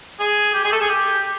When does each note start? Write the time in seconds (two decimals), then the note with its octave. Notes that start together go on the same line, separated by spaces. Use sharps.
0.20 G#4
0.54 G4
0.64 G#4
0.72 A4
0.81 G#4
0.89 G4